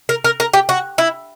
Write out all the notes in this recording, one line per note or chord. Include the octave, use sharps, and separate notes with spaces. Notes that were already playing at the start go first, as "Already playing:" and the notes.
A#4
A#4
A#4
G4
F#4
E4